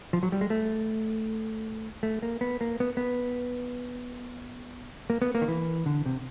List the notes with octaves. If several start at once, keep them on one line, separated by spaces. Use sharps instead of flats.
F3
F#3
G3
G#3
A3
A3
A#3
B3
A#3
B3
B3
A#3
B3
A#3
D#3
E3
D3
C3